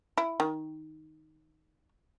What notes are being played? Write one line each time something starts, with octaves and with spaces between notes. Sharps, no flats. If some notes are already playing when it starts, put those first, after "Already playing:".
E4
D#3